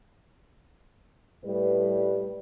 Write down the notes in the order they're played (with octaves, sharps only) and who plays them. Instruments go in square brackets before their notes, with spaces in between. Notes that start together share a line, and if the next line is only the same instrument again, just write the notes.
[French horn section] A2 G3 B4